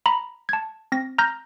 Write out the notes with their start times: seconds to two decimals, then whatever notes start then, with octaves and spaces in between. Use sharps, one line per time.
0.06 A#5 B5
0.49 A5 G#6
0.92 C4 A#6
1.18 A#5 F6 G6 A#6